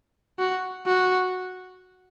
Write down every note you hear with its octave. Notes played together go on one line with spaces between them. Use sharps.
F#4
F#4